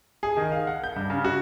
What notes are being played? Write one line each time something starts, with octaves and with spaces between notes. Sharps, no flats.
G#4
D#3
F5
F#5
G6
G2
C#3
F#4